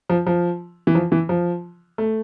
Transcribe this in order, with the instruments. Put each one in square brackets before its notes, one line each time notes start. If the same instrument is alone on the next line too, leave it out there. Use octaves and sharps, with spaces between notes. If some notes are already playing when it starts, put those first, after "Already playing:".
[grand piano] F3
F3
E3
F3
E3
F3
A3